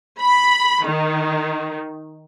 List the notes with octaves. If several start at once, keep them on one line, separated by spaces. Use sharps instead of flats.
B5
D#3